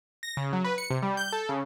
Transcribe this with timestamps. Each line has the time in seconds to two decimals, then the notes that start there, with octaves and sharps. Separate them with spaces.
0.23 A#6
0.37 C#3
0.53 F#3
0.64 B4
0.78 C#7
0.90 C3
1.03 G3
1.17 G6
1.33 A4
1.49 C#3